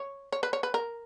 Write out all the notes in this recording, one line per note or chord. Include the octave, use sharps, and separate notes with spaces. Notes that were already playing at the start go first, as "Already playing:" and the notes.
Already playing: C#5
C#5
B4
C#5
B4
A#4